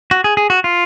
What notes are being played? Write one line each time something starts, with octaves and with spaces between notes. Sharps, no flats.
F#4
G#4
G#4
F#4
F4